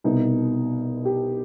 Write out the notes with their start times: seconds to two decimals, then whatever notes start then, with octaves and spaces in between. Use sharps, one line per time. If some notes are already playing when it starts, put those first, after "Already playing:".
0.04 C2 B2 B3 D#4
1.05 G4